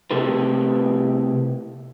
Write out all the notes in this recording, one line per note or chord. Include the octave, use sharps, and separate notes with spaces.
C3 A3 E4 G4 A4 B4